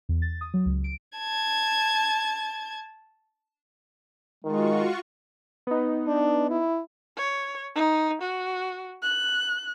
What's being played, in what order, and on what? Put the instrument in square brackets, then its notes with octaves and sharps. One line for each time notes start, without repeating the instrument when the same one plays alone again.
[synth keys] E2
A6
D#6
F#3
C#2
D7
[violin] A5 G#6
[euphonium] D#3 [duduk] G#3 [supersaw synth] F4 F#4 C#6
[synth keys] B3 D#4
[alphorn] D4
E4
[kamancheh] C#5
D#4
F#4
F#6